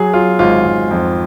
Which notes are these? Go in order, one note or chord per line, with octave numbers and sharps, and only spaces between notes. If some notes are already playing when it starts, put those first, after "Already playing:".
Already playing: F#3 G#4
F#3 F4
G#1 F4
G#1
F2